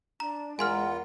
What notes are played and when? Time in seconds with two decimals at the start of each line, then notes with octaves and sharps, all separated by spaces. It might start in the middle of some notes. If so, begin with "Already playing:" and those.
0.20 D4 A#5
0.59 E2 G#3 F4 A#4 F#5 G#5 C6 F6